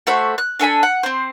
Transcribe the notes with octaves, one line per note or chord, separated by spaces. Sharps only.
A3 F#4 C5 B5
F#6
D4 A4 G#5 B5
F#5
C4 C5